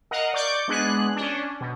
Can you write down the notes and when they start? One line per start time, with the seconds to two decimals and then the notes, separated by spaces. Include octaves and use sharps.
0.11 A#4 D#5 F5 F#5
0.34 D5 C#6 D6 G6
0.68 G#3 B3 D4 G#4 F#6
1.16 C#4 D4
1.61 B2